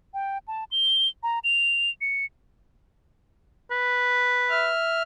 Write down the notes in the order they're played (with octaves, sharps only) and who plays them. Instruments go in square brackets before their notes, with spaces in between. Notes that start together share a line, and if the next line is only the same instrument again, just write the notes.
[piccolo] G5
A5
G7
A#5
F7
C#7
[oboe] B4
[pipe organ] E5 F6